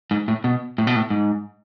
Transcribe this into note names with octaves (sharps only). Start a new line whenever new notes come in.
G#2
A2
B2
A2
B2
A2
G#2